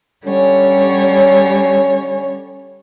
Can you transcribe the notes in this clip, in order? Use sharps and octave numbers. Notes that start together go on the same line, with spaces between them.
D3 G3 C#4 C#5